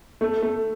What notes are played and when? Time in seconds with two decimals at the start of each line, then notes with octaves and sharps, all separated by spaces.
0.21 A3
0.42 A3